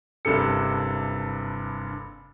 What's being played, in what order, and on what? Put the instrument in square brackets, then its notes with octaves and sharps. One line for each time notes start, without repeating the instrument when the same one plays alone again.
[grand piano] F#1 G2 C3 A4 C#7